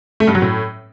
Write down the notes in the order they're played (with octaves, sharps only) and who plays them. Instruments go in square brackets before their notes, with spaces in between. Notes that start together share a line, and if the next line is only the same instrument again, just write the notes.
[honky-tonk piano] A3
G2
F#3
A2